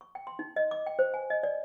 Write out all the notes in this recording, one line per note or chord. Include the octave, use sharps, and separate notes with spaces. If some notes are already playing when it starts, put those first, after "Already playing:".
C#6
G5
C6
D#4
D#5
D6
G5
C5
G#5
D#5
D5